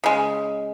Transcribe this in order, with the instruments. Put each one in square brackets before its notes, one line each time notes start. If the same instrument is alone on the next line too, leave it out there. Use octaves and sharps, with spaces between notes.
[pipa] C#3 G#3